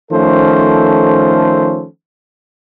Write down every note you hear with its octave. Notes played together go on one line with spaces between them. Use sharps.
D#3 F3 A3 C#4 A4 C5